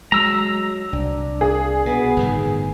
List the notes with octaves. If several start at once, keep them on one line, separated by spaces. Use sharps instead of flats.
F#3 G#3 A#5 E6
C2 D4
G#4
B2 B3
G1 A2 D#3